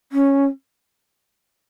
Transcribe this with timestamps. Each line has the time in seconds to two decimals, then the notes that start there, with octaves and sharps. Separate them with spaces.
0.12 C#4